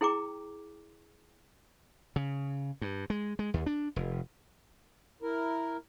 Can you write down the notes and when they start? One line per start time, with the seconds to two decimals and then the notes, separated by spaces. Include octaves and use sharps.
0.01 E4 G#4 G5 A#5 D6
2.16 C#3
2.81 G2
3.10 G#3
3.39 G#3
3.54 D#2
3.66 D4
3.96 F1
5.22 E4 A#4